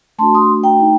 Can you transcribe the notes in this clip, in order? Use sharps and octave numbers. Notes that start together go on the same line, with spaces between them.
A3 D4 F#4 A5 C6
C6 D#6
G5 A#5
A3 D#4